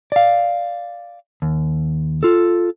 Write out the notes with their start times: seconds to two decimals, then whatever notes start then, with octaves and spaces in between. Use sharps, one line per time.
0.12 D5 F5
1.42 D#2
2.23 F4 A4